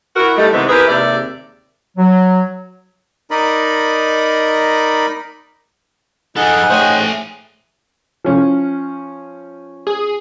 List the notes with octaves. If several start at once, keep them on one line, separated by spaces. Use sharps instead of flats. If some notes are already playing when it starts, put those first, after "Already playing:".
E4 F#4 A#4
G3 A3 D#4
C3 D#3 E3 G#3 B3 C4
E4 G4 G#4 A#4 B4
D#2 C3 G#3 D5 E5
F#3
D#4 A#4 D5 D#5 B5
F3 D#4 G#4 A4 F#5
A3 C5 C#5 G5 G#5
F3 C#4
G#4